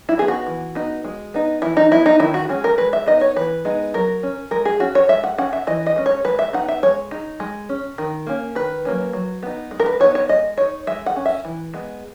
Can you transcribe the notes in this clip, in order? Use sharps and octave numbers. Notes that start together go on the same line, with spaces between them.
E4
B3 D#4 G#4
F#4
E3
B3 D#4
G#3
B3 D#4
E3 E4
D#4
B3 D#4 E4
D#4
D#3 E4
F#4
G#3 C#4 G#4
A#4
G#3 B4
E5
B3 D#4 D#5
C#5
E3 B4
G#3 B3 D#4
F#3 A#4
C#4
G#3 A#4
G#4
C#4 F#4
C#5
G#3 E5
F#5
C#4 F#5
E5
E3 D#5
D#5
G#3 C#4
C#5
G#3 B4
E5
B3 D#4 F#5
E5
G#3 C#5
D#4
G#3
C#4
D#3
A#3 C#4
D#3 B4
F#3 A#3 C#4
F#3
B3 D#4
G#3
A#4
B4
B3 D#4 C#5
C#5
G#3 D#5
D#4 C#5
G#3 E5
F#5
C#4
E5
E3
G#3 B3